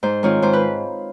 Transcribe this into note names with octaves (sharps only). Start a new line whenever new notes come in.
G#2 C5
D#3 G#3 C4 F4 C#5
G#2 C5
B4